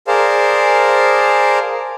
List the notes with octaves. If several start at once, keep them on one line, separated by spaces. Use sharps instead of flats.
G#4 A#4 C5 D5 F5 A5